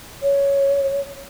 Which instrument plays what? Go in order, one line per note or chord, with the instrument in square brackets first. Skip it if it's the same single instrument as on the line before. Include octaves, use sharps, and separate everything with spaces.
[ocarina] C#5